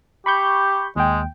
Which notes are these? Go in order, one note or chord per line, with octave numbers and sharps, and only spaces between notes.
G4 B5 C#6 G6
D#2 G#3 G5